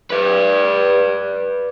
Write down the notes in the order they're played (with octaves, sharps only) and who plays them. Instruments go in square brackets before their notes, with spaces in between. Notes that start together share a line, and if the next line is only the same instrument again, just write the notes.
[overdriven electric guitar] B4 D5